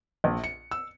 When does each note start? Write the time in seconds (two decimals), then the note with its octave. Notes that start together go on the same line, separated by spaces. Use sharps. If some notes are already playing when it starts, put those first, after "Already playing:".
0.24 A#1
0.44 C#7
0.71 E6